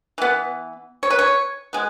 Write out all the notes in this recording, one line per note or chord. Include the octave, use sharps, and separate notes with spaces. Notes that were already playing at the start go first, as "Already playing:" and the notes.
E3 B3
C#5
B4
C#5
G#3 B3